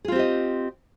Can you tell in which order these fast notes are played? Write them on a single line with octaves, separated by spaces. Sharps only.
G#4 F4 C4 G4 D#5